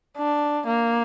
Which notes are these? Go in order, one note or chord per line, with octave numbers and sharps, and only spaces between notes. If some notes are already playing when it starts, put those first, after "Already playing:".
D4
A#3